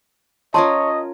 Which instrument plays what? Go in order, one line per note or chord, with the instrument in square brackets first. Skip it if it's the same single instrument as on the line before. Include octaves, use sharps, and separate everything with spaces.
[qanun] C#4 F4 A#4 [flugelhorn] C#5 [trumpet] D#5 [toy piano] A5 C6